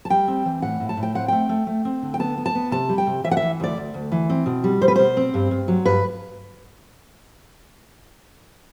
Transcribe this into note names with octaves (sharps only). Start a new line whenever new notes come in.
A5
G3 G5
C4
E3
A2 F#5
A2
A5
A2
G5
C4 F#5
A3 G5
A3
A3
C4
D3
G5
B3 A5
B3
A5
B3
C3 A5
G3
G5
C3
E3 E5
F#5
E5
E3
D2 D5
D2
D2
E3
C4
B2
G3
B2 C5
B4
B2 C5
C4
G2
G2
F#3
G2 B4